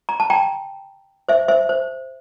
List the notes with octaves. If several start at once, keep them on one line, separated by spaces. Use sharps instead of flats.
A#5
A5
G5 A#5
C5 E5
C5 E5
C5